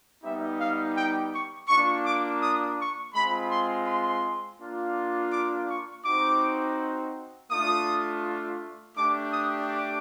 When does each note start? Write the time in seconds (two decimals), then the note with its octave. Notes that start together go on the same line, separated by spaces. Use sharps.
0.23 G3 B3 D#4 G4 E5
0.60 F5
0.97 G5
1.33 C#6
1.68 A#3 D4 F4 C#6
2.04 D6
2.41 D#6
2.78 C#6
3.14 G#3 C4 F4 B5
3.50 C6
3.86 C6
4.60 A#3 D4 F4
5.32 D6
5.69 C#6
6.04 C4 D#4 F#4 D6
7.50 A3 D4 F4 D#6
8.96 A3 D4 G4 D6
9.32 D#6
9.68 D6